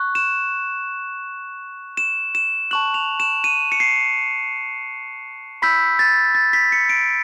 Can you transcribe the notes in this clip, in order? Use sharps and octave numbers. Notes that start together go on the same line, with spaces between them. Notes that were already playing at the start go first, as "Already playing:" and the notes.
Already playing: C#6 F#6
E7
E7
E7
A5 C#6 F#6 F#7
F7
E7
D#7
C#7
C7
B5 E6 G6 B6
A6
A6
B6
C#7
D7